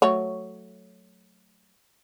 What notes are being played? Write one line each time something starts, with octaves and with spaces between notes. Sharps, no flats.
F#3 A3 C#5